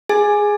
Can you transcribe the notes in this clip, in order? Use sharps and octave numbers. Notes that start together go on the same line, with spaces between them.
G#4 G#5